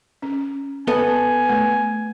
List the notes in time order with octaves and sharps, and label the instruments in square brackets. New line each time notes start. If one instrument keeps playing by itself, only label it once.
[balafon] C#4
[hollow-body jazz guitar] B3 A4 D#5 [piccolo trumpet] G#5
[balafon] A3 B4